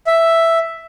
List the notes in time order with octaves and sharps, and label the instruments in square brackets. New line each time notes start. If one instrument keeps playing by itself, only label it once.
[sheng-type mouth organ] E5